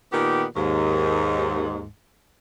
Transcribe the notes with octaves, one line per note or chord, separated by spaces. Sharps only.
A#2 D#3 B3 G4
D#2 G#2